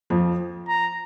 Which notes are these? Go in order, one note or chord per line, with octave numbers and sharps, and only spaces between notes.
F2 F3
A#5